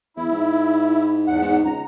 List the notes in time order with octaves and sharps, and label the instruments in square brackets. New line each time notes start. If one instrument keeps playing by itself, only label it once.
[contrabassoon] E2 [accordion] E4
[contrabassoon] G#2
[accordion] E2 F#5
[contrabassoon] G#2
[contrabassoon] C#2 [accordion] A#5